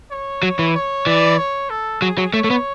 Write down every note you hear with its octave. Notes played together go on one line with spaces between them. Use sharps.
C#5
F#3
E3
C#5
E3 D5
C#5
A4
F#3 G#4
F#3
A3 C#5
A3
B3